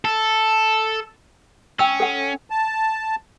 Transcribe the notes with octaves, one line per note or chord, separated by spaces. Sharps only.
A4
C#4 G5 E6
A4 F#5
A5